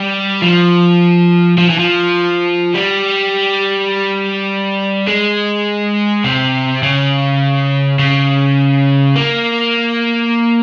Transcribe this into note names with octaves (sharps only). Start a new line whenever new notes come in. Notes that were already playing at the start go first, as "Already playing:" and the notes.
Already playing: G3
F3
F3
E3
F3
G3
G#3
C3
C#3
C#3
A#3